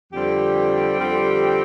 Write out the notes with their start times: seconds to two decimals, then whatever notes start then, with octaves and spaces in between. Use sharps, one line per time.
0.13 F2 D3 G3 C4 G4
0.95 F2 D3 G3 C4